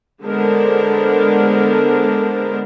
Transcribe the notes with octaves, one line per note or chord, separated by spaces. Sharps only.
D3 G#3 B3 D4 A#4 C5